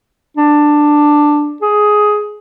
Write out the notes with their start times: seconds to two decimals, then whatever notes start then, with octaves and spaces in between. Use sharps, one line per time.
0.37 D4
1.62 G#4